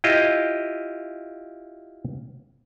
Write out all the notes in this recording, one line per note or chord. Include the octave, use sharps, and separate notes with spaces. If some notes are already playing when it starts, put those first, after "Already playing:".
E4 F4 G4 D#5